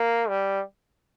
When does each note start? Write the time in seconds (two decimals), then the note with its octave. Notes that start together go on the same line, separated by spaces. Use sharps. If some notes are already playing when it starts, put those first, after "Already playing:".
Already playing: A#3
0.29 G3